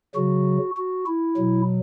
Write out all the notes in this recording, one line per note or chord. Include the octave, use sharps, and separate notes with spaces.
C#3 F#3 F#4
F#4
E4
B2 F#3